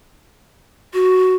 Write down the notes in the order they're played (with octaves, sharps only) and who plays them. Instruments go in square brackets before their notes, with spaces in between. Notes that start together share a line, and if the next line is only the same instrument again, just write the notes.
[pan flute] F#4